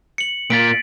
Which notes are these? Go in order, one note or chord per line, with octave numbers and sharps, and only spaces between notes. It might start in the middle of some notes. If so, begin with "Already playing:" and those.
C#7 F#7
A#2 A#3 A6 B6 D7